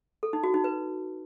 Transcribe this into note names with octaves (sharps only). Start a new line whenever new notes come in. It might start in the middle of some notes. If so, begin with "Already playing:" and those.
A4
D#4
F#4
D#4
B4